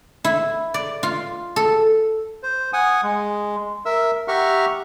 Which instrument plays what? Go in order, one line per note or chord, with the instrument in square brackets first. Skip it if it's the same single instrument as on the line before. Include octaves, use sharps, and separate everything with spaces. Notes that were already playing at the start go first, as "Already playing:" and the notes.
[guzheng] E4
D5
F4
A4
[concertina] C5
F#5 G#5 D#6
G#3
A#4 E5 E6
G4 E5 F#5 A#5 C#6 F6